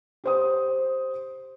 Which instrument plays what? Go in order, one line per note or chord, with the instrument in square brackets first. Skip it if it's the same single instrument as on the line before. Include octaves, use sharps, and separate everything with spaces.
[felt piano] G4 C5 D#6